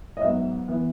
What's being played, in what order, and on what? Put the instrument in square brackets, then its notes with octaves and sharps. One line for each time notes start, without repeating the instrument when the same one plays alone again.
[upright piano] D#5
G#2 F#3 B3 E5
E3 B3